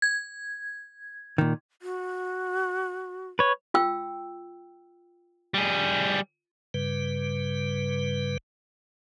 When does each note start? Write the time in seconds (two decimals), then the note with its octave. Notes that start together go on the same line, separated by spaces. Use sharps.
0.02 G#6
1.38 A#2 D#3
1.82 F#4
3.39 B4 C#5
3.74 F4 G5 E6
5.54 G3 G#4
6.74 G2 C#3 G3 B4